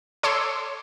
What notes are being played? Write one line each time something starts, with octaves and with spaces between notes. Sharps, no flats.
A4 C#5 C6 D6 E6